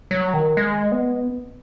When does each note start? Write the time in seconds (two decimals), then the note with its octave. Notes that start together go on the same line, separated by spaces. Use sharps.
0.11 F#3
0.34 D#3
0.57 G#3
0.92 B3